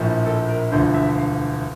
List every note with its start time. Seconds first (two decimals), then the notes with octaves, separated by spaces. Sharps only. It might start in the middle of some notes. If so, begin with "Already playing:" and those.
Already playing: A#1 A2 F3
0.26 A4
0.48 A#4
0.71 E1 D2 D3 F3 C5
0.94 E5
1.16 F5